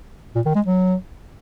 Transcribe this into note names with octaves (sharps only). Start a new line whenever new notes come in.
A#2
D#3
G#3
F#3